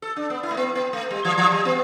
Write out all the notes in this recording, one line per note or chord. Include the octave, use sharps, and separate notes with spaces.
A4
D4
B3
E4
A3
B3
B3
A3
G3
E3
E3
G3
B3